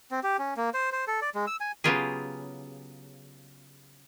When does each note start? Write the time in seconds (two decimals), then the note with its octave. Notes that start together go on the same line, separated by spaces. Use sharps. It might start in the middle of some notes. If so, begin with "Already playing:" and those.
0.11 C4
0.23 G4
0.39 C#4
0.57 A#3
0.74 C5
0.92 C5
1.07 A4
1.22 D5
1.35 G#3
1.47 E6
1.60 G#5
1.84 C#3 F#3 B3 F4 G4 G#4